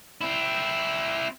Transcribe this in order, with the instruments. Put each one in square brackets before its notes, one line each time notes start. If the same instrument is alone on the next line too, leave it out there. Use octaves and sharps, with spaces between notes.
[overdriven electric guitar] C4 E4